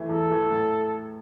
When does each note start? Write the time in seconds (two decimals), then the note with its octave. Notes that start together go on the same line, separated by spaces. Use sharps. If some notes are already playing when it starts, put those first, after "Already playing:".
Already playing: E3 A3
0.09 E2 A4
0.30 E3 A3
0.51 A2